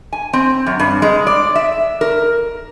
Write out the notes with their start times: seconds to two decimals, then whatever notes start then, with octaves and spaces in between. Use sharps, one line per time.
0.13 G#5
0.33 C4
0.66 F#2
0.79 G2
1.02 G#3
1.27 D5
1.55 E5
2.01 A#4